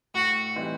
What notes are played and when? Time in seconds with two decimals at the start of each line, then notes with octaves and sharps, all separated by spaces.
0.14 A2 F#4
0.56 E3 G3 C4 D#4